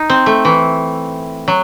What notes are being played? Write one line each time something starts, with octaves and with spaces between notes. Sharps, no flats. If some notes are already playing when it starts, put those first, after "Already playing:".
Already playing: D#4
C4
A3
E3
F#3